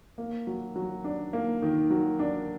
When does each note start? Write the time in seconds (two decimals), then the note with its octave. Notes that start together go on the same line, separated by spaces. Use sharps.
0.18 A#3
0.47 F#3
0.76 F#3
1.04 D4
1.33 A#3
1.62 D#3
1.90 F#3
2.19 D4